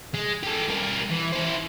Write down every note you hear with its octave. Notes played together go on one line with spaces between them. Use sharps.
G#3
G4 A4
G3 A#4
E3
E4 C5